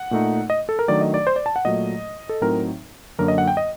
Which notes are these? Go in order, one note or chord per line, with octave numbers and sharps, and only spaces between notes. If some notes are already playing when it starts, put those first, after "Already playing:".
Already playing: F#5
A#2 A3 D#4
D#5
A4
A#4
D#3 F#3 A3 D4 D5
D#5
D5
C5
D5
A5
F#5
A#2 F#3 A3 D#5
A4
A2 F#3 C4 D#4 A#4
F#2 D3 F#3 A#3 D4 A#4
D#5
F#5
G5
D#5